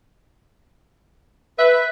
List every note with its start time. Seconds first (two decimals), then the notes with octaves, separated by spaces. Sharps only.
1.58 B4 E5